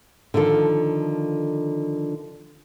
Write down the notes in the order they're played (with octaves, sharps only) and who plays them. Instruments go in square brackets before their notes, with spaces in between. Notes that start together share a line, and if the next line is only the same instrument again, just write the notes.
[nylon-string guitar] D3 D#3 F3 A4